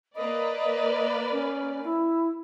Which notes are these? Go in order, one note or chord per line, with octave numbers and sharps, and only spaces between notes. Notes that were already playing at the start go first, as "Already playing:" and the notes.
A#3 B4 D5 D#5
C#4
E4